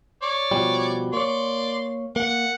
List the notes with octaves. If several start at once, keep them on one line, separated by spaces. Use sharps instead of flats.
C#5 D5
B2 F3 G3
A#3 C#5 D5 C6
A#3 F#5